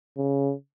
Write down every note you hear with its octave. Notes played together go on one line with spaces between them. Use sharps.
C#3